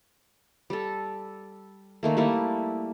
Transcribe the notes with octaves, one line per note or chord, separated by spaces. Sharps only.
G3 A4
D#3 A3 A#3
G3 A3 A#3 E4